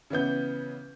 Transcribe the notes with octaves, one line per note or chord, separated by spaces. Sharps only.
C#3 E3 B3 G6